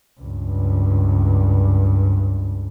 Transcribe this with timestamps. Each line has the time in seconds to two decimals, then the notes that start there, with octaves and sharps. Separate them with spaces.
0.21 C#2 G2